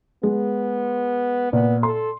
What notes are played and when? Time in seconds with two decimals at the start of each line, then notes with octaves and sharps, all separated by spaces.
0.23 G#3 B3
1.53 A#2 B3
1.83 A4 C6